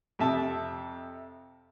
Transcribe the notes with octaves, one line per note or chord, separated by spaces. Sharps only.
F2 C3 E5 A5